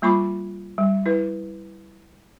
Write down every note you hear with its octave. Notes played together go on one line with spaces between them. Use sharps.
G3 A#3 F4 B5 C#6 D6
G3
E4 B4